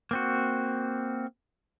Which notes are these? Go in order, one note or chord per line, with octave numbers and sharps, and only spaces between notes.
A#3 C4 F#4